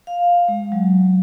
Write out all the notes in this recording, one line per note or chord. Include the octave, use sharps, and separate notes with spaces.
F5
G#3
F#3